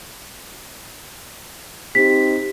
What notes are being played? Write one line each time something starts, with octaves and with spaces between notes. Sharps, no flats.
C4 D#4 G4 B6